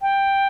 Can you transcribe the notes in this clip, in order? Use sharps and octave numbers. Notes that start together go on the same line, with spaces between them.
G5